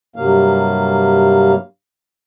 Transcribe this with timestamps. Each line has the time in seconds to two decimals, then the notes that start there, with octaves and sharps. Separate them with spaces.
0.16 G2 C3 F#3 A#3 F5